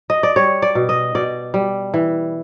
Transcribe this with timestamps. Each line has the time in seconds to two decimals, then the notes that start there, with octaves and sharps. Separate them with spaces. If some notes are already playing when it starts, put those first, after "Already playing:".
0.10 D#5
0.23 D5
0.36 G3 C#5
0.62 D5
0.75 B2
0.89 D#5
1.15 B2 D5
1.54 G3
1.94 E3